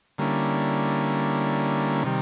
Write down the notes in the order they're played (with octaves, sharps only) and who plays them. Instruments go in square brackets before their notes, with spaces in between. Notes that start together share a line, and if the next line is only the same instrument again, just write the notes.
[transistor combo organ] D3 G3 A#3 C#4 E4
C3 D#3 G3